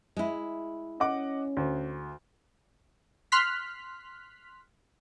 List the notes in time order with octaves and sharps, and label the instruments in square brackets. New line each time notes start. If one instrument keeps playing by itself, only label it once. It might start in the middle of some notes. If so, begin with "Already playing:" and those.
[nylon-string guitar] G#3 E4
[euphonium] C#4 [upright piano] D#5 F#5 D6
[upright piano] D2
[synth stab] C6 F6 F#6 B6